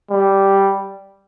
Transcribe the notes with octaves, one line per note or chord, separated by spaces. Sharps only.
G3